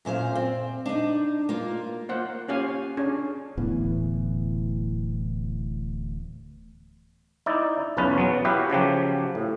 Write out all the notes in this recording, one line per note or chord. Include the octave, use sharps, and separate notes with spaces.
F#2 A#2 C5 F5
C4
D4 D#4
A#3 F4
A#3 F4 C5 F#5
C#4 F4 G4 C#5 F5 G#5
C#4 D4 G#4
D1 A2 E3 B3
D#4 E4 D5
B1 E2 C#4 F4 B4 A5
F#3 B3
E4 F#4 G4 B4 F5
C#3 F3 F#3 G4
A2